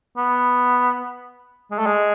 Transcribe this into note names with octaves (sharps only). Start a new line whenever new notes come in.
B3
G#3
A3
G#3